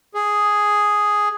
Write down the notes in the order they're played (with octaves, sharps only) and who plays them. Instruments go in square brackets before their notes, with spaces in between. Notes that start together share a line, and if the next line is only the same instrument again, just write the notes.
[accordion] G#4